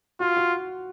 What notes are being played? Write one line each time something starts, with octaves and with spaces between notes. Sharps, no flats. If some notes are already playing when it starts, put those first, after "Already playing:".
F4 F#4
F#4